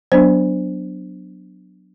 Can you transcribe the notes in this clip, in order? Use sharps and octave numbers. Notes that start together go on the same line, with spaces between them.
F#3 B3 D4 C5